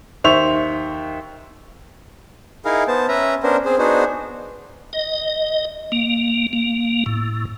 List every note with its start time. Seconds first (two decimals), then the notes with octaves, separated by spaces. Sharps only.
0.24 D#2 C5 E5 C#6 F7
2.65 D#4 E4 G#4 A#4 F5
2.88 B3 C5 A5
3.08 C#4 B4 E5 A#5
3.43 B3 C#4 D4 A#4 C5
3.65 C4 G#4 C5
3.78 B3 D4 D#4 F#4 G#4 C5
4.93 D#5
5.92 A#3
6.53 A#3
7.06 A2